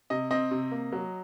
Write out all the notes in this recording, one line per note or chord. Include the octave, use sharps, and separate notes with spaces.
C3 D#5
C4 D#5
C3
A#3
F#3